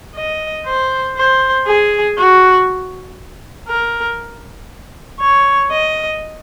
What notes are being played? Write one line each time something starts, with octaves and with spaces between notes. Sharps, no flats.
D#5
C5
C5
G#4
F#4
A#4
C#5
D#5